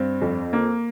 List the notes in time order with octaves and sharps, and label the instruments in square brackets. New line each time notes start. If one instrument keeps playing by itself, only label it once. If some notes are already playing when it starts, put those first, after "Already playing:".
Already playing: [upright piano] G2 C4
F2
A#3